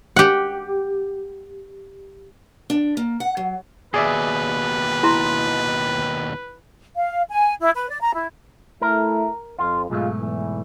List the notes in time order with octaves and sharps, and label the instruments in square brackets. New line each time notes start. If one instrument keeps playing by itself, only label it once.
[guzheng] G4 F#5
[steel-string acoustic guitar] D4
A#3
F#5
F#3
[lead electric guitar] D#2 B2 [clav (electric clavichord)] G#4 D5 E5 [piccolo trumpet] B4
[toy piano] E4 A#5 C6
[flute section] F5
G#5
E4
B4
D5
A#5
E4
[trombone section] A3 E4 [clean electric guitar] A#4
[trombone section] F2 [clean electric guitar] F4
[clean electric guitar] B1 G#2 A3 [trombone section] G#3 F4
[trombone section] E2 E3